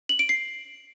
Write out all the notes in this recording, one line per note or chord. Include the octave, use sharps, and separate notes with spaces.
F#7
D7
C7